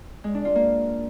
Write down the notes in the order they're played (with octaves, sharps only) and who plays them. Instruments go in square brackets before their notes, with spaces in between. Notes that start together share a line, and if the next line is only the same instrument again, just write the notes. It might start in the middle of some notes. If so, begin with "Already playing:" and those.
[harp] G#3
D4
F4
A#3